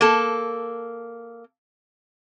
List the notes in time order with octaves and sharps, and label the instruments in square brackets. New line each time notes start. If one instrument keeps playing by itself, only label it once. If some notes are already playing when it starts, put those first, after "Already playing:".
[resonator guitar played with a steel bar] A#3 A4